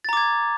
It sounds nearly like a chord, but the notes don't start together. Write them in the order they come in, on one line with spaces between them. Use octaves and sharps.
A6 A#5 D6 G#6